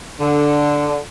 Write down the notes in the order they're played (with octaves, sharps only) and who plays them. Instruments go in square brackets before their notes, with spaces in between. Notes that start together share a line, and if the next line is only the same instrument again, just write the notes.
[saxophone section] D3